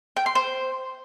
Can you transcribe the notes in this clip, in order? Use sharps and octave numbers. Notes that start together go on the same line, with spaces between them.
G5
C6
C5